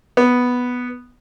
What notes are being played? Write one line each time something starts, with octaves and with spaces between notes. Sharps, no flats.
B3